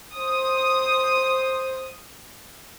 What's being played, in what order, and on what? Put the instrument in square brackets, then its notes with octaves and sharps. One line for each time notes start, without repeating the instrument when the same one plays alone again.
[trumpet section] C5 [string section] D#6